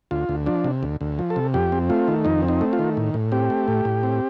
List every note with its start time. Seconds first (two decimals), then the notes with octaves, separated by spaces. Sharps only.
0.11 D2 F4
0.29 D2
0.46 F3 D4
0.64 C3
0.83 D2
1.01 D2
1.19 F3
1.30 A4
1.36 C3
1.54 F2 G4
1.72 C4
1.90 A3 F4
2.08 D#3
2.25 F2 D#4
2.42 C4
2.48 D#4
2.61 A3
2.73 F4
2.79 D#3
2.97 A2
3.14 A2
3.32 C4 G4
3.50 A3
3.68 A2
3.85 A2
4.03 C4